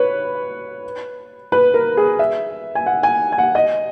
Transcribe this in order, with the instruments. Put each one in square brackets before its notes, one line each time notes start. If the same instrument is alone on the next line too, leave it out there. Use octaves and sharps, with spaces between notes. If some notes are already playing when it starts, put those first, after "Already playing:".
Already playing: [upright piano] B4 C#5
B4
A#4
G#4
E5
G#5
F#5
G#5
G#5
F#5
D#5